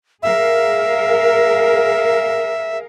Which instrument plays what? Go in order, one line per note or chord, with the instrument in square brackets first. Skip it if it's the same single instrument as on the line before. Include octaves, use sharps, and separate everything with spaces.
[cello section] G#4 A#4 F5 [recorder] E5